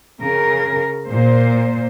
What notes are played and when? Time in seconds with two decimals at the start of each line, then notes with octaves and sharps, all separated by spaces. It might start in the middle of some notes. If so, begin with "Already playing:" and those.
0.20 C#3 A#4
1.10 A#2 C5